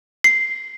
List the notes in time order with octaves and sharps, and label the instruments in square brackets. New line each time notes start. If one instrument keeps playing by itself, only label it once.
[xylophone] C7